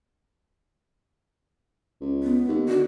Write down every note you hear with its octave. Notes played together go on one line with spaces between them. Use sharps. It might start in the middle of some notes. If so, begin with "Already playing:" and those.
C#2
B3
D#2
D3 F#4